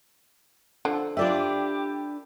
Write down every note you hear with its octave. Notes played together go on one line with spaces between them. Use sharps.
D3 F3 A4
D4 F4 G4 A4 B4 D5 E5